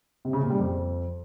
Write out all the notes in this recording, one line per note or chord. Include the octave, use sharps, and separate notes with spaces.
C3
C#3
A#2
G3
F2